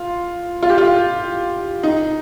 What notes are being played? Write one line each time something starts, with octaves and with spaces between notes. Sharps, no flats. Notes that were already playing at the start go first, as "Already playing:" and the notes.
Already playing: F4
F4
G4
F4
D#4